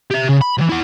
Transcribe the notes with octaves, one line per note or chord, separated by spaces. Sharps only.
G4 E5
C#3
B5
C3 E3
E4 F#5